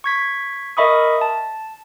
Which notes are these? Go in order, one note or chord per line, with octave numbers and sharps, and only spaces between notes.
C#6 G#6 B6
A#4 D#5 E5 B5 C#6 D#6
A5